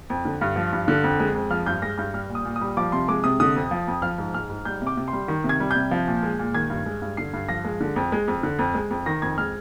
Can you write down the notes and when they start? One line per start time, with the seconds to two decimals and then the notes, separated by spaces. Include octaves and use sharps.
0.10 F2
0.25 D3
0.41 G2
0.56 F3
0.73 G2
0.88 D3
1.04 F2
1.20 G#3
1.35 F2
1.50 F3 F6
1.66 G2 G6
1.82 G#3 A#6
1.98 G2 G6
2.14 G3 F6
2.29 A#2
2.35 D#6
2.45 A#2
2.56 D#6
2.61 G3
2.77 F3 D6
2.92 C3 C6
3.08 G#3 D6
3.24 C3 D#6
3.40 D3 D#6
3.56 F2
3.71 F3
3.88 F2
4.02 F3 F6
4.18 G#2
4.34 G#3 F6
4.50 G#2
4.65 G3 G6
4.82 C3 D6
4.97 C3
5.08 C6
5.13 G3
5.28 D#3
5.44 C3
5.49 G#6
5.60 G3
5.71 C3 G6
5.91 F3
6.07 A#2
6.23 G#3
6.39 A#2
6.54 D#3 G#6
6.70 G2
6.86 G#3
7.02 G2
7.17 D3 C7
7.33 G2
7.49 F3 A#6
7.65 G#3
7.81 D3
7.96 F2
8.12 G#3
8.28 F2
8.43 D3
8.59 F2
8.74 G#3
8.90 F2
9.06 D#3 A#6
9.22 F2 G#6
9.38 G#3 F6